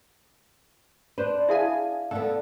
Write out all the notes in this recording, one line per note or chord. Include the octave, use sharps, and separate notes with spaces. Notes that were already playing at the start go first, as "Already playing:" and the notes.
D4 B4 C5
E4 G#4 E5 F5 G#5 A5
D3 B3 A4